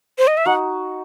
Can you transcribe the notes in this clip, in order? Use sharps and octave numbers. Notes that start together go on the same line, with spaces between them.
C5
D#5
E5
D#4 F#4 F#5